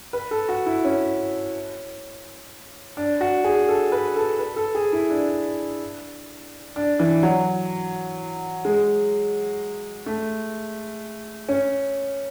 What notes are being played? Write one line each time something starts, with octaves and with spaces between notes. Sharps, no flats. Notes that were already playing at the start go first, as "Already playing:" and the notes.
B4
A4
F#4
E4
C#4
D4
F#4
G#4
A4
B4
A4
B4
A4
G#4
E4
D4
D4
E3
F#3
G#3
A3
C#4